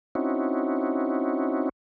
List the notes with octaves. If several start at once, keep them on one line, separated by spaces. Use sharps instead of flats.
C4 C#4 D#4 E4 F#4